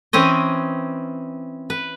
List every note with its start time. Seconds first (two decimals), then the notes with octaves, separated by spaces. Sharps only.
0.13 E3 C4 C#4 D#5
1.70 B4